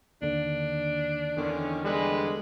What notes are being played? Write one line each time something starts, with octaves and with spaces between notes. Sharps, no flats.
D#2 D3 D4
E2 D3 D#3 C#4
D3 G3 G#3 B4